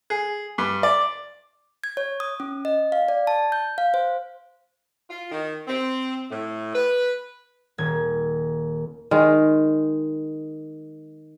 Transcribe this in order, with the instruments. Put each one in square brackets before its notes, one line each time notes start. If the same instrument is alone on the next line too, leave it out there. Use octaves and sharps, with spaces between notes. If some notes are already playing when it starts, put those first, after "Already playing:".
[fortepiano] G#4
G2
D5
[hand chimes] G#6
C#5
D#6
C#4
D#5
F5
D5
A5
G6
F5
C5
[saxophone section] F4
D#3
C4
A2
B4
[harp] D#1 G#6
[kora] D#3 G#3